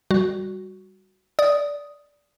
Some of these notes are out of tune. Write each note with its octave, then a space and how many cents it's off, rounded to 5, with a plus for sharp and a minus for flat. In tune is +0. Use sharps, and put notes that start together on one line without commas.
G3 +0 F#4 +0
D5 -15 D#6 +0